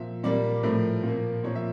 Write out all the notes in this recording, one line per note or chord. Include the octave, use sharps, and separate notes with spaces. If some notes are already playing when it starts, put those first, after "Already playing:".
Already playing: A#2 F3 E5
A#2 G3 A#3 D5
A2 F3 A3 A#4
A#2 F3 A#3
A#2 F3 A#3 C#5
E5